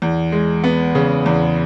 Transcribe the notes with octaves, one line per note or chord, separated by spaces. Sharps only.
E2
G#3
B3
C#3
E2